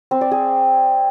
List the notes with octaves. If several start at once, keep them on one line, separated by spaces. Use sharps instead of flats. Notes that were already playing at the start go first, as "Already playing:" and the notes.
C4
D5
G#4